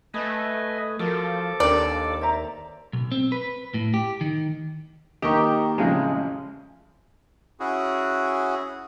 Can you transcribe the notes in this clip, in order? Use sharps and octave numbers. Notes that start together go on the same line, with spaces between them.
A3 B4 D#5 G#5
F3 F#4 A4 A#4 D6
D#2 D4 G4 A#4 D5
C5 E5 A#5
B1
C4
B4
A2
G4
D#3
D#3 A#3 G4 D#5 C#6
A1 F2 C#3 G#3
C#4 E4 F#4 G#4